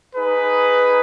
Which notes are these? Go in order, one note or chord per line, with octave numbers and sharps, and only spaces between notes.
D#4 G#4 B4